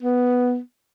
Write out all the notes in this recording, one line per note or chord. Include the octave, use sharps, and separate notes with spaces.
B3